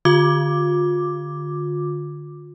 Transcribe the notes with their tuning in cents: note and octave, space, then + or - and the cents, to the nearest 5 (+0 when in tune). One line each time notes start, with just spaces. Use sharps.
D3 +5 F4 +30 D6 +0